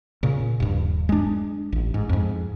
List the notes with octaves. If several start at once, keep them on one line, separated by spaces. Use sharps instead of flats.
A#2 C#3
D#1 G2
G#3 D4
A1
G#2
F2 G#2